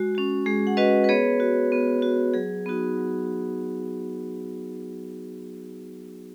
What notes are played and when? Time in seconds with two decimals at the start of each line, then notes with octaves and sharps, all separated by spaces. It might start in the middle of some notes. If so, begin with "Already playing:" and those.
Already playing: G#3 F#4
0.15 C#4 F#4
0.46 G#3 G#4
0.67 F#5
0.77 C#4 F#4 B4 D#5
1.04 B4
1.09 B3 G#4 C#5
1.40 F#4
1.72 B3
2.02 F#4
2.34 F#3 G#4
2.66 B3 D#4 F#4
2.98 F#3